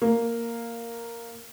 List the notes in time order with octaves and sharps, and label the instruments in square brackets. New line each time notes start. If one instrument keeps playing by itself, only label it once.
[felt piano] A#3